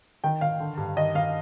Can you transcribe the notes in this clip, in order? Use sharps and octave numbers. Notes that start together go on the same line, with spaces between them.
D#3 G5
D#3 F5
D3
G2
D#3 D#5
D#3 F5